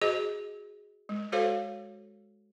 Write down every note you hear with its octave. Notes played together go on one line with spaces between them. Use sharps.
F#4 G#4 C5 D#5
G#3
F#4 A4 C5 C#5 F5